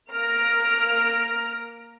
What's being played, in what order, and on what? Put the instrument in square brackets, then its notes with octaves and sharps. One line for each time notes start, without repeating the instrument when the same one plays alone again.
[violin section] A#3 F6 A#6 D7